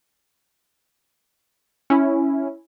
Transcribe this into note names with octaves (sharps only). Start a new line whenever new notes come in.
C#4 E4